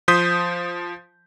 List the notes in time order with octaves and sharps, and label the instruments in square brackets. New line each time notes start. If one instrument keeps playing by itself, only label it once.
[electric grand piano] F3 C5 C6 D#6 G6 B6